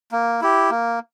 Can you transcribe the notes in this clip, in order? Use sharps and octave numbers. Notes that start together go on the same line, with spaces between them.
A#3
E4 G4
A#3